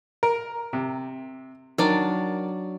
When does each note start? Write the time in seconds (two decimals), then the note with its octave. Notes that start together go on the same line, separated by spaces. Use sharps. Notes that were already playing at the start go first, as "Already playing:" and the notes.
0.23 A#4
0.73 C3
1.78 D#3 F#3 D4 D5